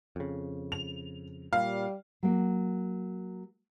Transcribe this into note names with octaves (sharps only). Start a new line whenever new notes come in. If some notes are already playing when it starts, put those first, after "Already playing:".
F2 C#3
F7
A#2 G3 F5
F#3 A#3